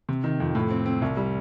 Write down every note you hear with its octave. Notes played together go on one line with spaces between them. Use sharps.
C3
D#3
F2
A2
C4
C4
C2
G3